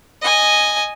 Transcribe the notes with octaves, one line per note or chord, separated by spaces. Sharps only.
D#5 G#5